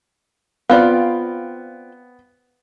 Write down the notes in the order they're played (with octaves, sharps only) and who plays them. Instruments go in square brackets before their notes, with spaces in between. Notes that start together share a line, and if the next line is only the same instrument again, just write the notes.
[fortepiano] B3 [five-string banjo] C4 F4 D5 [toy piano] F5 B5